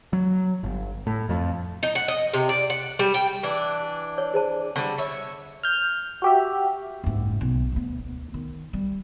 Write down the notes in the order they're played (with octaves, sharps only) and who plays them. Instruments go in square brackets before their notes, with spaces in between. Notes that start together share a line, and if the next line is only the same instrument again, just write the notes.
[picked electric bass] F#3
G1
A2
F2
[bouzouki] D#4
F#5
D#5
C3
D5
F#5
G3
G5
E3 D4
[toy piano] C#5
G#4 C5 A5
[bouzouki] D3 G3 [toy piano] C#6
[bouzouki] C#5 E5
[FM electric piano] F6 G6
F#4 G4 E5
[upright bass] F#1 G#2
B1
D2 B3
D#3
G3